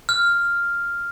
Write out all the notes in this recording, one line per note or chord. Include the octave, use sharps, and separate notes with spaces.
F6